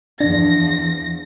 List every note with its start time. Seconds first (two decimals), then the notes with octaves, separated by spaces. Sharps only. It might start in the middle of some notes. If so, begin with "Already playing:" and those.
0.20 E2 F3 D4 A#6